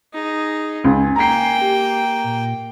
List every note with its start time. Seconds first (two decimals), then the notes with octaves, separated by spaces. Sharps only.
0.14 D#4 G#4
0.84 C#2 G#5
1.16 A#3 G5 A#5 C7
1.61 G4
2.24 A#2